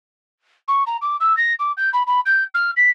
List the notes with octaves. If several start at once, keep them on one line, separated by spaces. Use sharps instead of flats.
C#6
A#5
D6
E6
A#6
D6
G6
B5
B5
G6
F6
B6